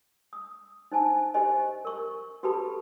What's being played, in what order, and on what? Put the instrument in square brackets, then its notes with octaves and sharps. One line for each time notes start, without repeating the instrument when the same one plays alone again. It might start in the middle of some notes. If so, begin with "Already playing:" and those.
[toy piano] D#6
D#4 C5 G#5 A5
G4 C5 D#5 G#5
A#4 C#6
F#4 G4 A4 B4 A5 B5